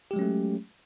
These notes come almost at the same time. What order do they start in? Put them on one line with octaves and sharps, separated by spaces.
G4 G#3 F#3 C#4 A3